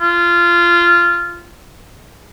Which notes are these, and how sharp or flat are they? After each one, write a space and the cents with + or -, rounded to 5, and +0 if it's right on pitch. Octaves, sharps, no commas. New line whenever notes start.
F4 -15